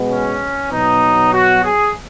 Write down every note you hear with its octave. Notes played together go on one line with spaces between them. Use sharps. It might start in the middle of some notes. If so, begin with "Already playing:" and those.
Already playing: B2 G#3 B3
C#4
B2 F#3 B3 D#4
F#4
G#4